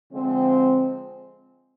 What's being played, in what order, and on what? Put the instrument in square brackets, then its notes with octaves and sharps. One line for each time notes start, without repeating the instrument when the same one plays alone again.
[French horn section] D3 F3 G#3 C4